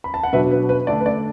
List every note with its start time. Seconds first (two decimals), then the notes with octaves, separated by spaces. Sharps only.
0.04 B5
0.14 A5
0.23 F#5
0.33 B2 F#3 D4 B4 E5
0.51 B4
0.69 B4
0.87 D3 A3 D4 D5
1.00 B4
1.06 D5